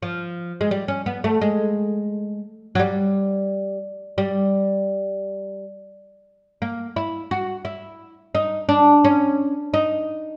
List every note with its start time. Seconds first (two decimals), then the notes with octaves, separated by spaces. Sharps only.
0.02 F3
0.61 G#3
0.71 G3
0.88 C#4
1.06 B3
1.24 A3
1.41 G#3
2.75 F#3
2.79 G3
4.18 G3
6.62 A#3
6.96 E4
7.31 F#4
7.65 E4
8.35 D#4
8.69 D4
9.04 C#4
9.74 D#4